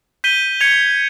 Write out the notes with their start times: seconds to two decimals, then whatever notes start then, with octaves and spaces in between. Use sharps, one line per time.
0.24 G6 B6 D#7 G7
0.60 G#6 C#7 F7